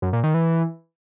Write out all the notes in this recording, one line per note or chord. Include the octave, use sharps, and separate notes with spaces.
F#2
A#2
D#3
E3